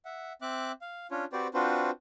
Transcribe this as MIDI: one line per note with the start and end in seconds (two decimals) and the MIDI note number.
0.05 0.33 76
0.05 0.33 78
0.42 0.72 60
0.42 0.72 76
0.42 0.72 86
0.42 0.72 90
0.81 1.07 77
1.11 1.25 61
1.11 1.25 62
1.11 1.25 65
1.11 1.25 73
1.33 1.47 60
1.33 1.47 66
1.33 1.47 67
1.33 1.47 71
1.33 1.47 72
1.33 1.47 74
1.54 1.90 60
1.54 1.90 62
1.54 1.90 65
1.54 1.90 66
1.54 1.90 71
1.54 1.90 72